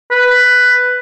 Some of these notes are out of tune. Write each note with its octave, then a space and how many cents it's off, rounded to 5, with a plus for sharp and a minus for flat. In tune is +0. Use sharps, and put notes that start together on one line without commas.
B4 +5